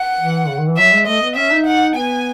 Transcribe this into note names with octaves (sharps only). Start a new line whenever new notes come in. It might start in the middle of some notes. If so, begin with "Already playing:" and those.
Already playing: F#5
E3
C#3
D#3
E3
F#3 E5
G#3
A3 D#5
B3
C#4 E5
D#4
F#5
B3 G#5